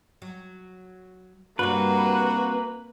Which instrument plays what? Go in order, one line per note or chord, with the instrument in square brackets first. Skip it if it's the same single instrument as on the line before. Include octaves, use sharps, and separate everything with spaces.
[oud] F#3
[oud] G2 C3 [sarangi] A#3 [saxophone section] D4 F#4 [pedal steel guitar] B4